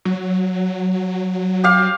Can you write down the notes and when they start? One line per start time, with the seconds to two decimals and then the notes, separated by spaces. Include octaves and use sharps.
0.05 F#3
1.64 G4 F5